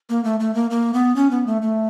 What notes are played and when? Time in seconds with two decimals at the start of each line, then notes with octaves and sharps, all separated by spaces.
0.09 A#3
0.24 A3
0.40 A3
0.55 A#3
0.70 A#3
0.94 B3
1.16 C#4
1.31 B3
1.47 A3
1.62 A3